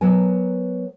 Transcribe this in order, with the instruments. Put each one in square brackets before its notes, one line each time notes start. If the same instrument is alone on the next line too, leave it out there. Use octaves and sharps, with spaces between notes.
[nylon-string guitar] F#3 B3 A#4 G#5